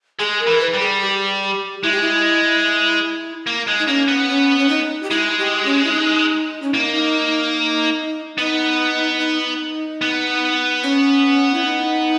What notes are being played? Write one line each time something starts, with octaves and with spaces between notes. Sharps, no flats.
G#3 G#4
A#4
E3
B4
G3
G#4
G4
G#3 E4
G4
E4
A#3
G#3
D#4
A#3 C#4
B3
C#4
C#4
D#4
G4
G#3 E4
G4
C#4
E4
D#4
C#4
A#3 D#4 E4
B3 D#4
D#4
B3
C#4
E4
D#4